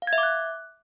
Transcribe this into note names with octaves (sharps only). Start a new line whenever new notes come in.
F5
G#6
E5
D6
F#6